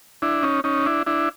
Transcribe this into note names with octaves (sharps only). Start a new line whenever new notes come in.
D4 E4
C#4 D#4
C#4 D#4
D4 E4
D4 E4